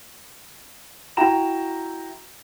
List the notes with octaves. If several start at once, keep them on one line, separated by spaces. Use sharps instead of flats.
E4 F#4 G5 A#5 E7